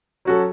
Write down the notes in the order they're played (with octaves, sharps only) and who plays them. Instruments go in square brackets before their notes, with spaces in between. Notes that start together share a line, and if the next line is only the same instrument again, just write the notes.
[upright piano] F#3 C#4 F#4 A4